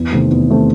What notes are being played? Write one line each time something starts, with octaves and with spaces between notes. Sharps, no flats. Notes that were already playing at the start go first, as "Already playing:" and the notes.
Already playing: E2
C3 D#3 A3 C4
E2
C3 D#3 A3 C4